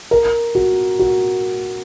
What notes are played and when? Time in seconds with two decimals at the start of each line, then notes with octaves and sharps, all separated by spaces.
0.11 A#4
0.55 F#4
0.99 F#4